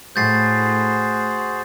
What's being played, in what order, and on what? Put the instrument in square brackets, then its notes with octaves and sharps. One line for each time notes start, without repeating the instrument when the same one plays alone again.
[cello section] A2 [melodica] F#4 G#4 C5 [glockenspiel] G6 A6 C7